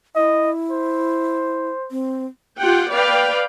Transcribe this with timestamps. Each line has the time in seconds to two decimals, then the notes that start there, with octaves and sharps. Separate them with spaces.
0.16 E4 D#5
0.71 C5
1.91 C4
2.59 F4 G4 F#5 G5
2.92 B4 D5 F5 G5